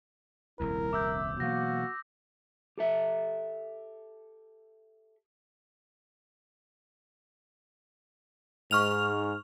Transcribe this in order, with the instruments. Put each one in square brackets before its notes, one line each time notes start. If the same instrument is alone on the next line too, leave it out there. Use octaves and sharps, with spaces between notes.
[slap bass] D#1 C2 F2 [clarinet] E4 [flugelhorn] A#4
[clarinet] E5 [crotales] D6 E6 G6
[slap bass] B2 E3 F#3 [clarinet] A#3 [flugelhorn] F#4 [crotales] A#6
[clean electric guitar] G4 A4 E5
[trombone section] G#2 [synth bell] C#6 F6 F7